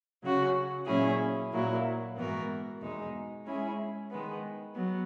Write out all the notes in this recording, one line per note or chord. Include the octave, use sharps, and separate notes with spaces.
C#3 F#3 C#4 F#4
A#2 F#3 C#4 E4 G#4
A#2 F#3 A#3 E4
G#2 E3 B3 F#4 A#4
E2 B2 G#3 D#4
G#3 C#4 E4 G#4
D#3 G#3 B3
F#3 B3